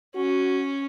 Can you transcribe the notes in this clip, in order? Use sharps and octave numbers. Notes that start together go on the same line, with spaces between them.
C#4 F#4